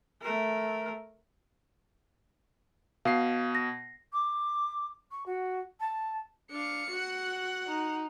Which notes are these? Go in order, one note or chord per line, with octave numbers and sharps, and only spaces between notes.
A3 A#4
B2 F5 C7
A#6
D6
C#6
F#4
A5
D4 F5 C#7
F#4 F#5
D#4